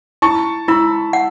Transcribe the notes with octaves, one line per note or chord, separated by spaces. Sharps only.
E4 A5 C#6
E4 B5 E6
F#5